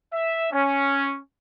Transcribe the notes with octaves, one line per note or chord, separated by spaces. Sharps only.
E5
C#4